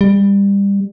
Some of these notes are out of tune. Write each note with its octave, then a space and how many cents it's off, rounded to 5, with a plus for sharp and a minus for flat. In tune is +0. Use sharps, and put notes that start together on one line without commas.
G3 +25